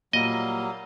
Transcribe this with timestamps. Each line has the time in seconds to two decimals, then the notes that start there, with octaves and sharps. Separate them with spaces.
0.13 A#2 F#3 G3 A#3 D#5